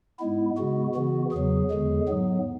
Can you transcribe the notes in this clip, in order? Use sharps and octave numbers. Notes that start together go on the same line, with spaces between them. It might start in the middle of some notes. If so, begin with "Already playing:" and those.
G#2 G#3 B3 E4
C#3 G#3 B3 F#4
C#3 E3 B3 F#4
E2 C#3 F#3 G#4
E2 D3 G#3
G#2 F#3 B3